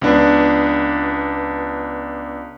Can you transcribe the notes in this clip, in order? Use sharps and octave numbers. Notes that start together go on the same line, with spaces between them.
C#2 B3 D4 B4